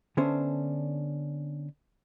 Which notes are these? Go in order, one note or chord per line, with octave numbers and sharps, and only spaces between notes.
D3 B3 C#4 D4 C5 E5